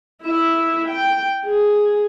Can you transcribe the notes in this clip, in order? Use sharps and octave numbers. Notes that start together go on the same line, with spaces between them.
E4 E5
G5
G#4